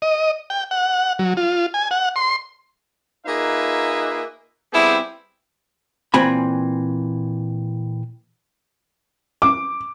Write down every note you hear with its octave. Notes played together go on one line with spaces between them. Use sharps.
D#5
G5
F#5
F#3
F4
G#5
F#5
C6
A#3 D#4 F4 G#4 B4 E5
G3 B3 C4 E4 G4 G#4
A#2 E3 C4 G#5 B5
D6